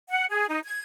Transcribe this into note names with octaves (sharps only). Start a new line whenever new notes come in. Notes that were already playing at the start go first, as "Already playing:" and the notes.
F#5
G#4
D#4
G#6